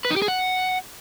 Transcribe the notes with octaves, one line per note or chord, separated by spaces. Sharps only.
B4
D#4
G4
G#4
F#5